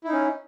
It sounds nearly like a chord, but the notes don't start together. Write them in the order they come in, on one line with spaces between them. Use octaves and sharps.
E4 D#4 C#4